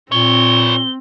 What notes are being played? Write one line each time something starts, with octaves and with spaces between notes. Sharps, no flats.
A#2 C4 B4 C#5 G7